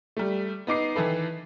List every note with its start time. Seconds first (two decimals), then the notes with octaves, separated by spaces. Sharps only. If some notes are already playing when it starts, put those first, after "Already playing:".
0.17 G3 A3
0.67 B3 D#4 D6 C7
0.95 D#3 E3 E4 A4 B4